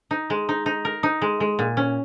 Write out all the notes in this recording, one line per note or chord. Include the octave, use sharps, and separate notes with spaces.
D#4
G#3
D#4
D#4
A#4
D#4
G#3
G#3
A#2
C#4